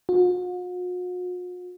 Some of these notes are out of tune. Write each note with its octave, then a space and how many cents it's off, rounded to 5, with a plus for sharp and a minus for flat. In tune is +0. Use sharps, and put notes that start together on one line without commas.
F#4 -45